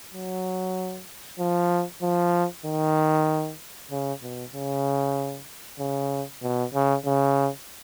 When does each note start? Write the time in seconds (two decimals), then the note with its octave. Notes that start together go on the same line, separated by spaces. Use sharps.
0.14 F#3
1.39 F3
2.02 F3
2.66 D#3
3.91 C#3
4.22 B2
4.53 C#3
5.79 C#3
6.42 B2
6.74 C#3
7.05 C#3